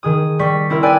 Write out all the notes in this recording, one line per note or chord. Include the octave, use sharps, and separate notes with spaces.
D#3 G#4 D#6
G3 C#6 B6
C4 E4 A#4 E5
B4 D5 G5 G#5 E6